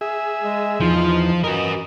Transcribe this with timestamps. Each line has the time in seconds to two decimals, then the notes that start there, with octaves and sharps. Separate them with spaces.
0.01 G#4 E5
0.42 G#3
0.80 E2 F3 D#4 F4
1.44 E3 F#4 A#4 D#5